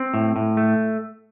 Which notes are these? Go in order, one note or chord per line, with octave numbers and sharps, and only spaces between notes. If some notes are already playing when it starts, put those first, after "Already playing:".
Already playing: C4
A2
A2
A3